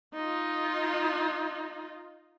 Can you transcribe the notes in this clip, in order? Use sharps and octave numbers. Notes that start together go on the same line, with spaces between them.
D#4 F4